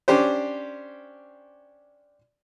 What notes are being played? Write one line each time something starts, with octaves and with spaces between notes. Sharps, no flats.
C#4 D4 G4 C5